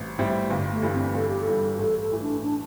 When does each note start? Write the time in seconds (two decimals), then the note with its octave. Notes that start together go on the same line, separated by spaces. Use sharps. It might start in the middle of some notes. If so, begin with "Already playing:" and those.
Already playing: A1 A2 G3 C4
0.18 A2 G3 C4 E4
0.50 G1
0.72 A3
0.82 G2 E3 G3
0.94 C4
1.14 G1 A4
1.28 G4
1.42 A4
1.47 G2 E3 G3
1.75 G4
1.79 A1 A4
2.00 A4
2.12 A2 E3
2.22 D4
2.43 D4